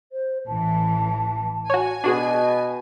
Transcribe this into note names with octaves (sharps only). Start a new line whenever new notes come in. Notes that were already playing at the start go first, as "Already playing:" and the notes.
C5
A1 E3 A5
F#4 C#5 G#5
B2 D4 F#4 G#4